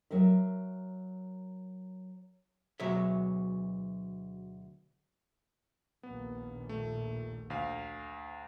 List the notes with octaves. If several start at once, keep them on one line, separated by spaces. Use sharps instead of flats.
F#3 A#4 D#5 E5
D2 B2 F#3 G#3 C#5 E5
A#1 D#2 A#2 B3
A3
D2 F5